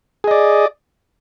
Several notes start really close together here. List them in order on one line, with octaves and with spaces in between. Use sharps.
G#4 D#5 D5